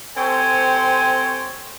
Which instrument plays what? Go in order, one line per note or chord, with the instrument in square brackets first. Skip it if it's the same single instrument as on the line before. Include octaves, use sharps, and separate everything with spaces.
[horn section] C4 G4 A4 C5 C#5 G#5